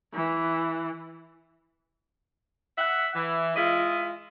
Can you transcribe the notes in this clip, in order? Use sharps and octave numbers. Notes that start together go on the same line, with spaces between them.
E3
E5 F#5
E3
G#3 E4 F4 D#5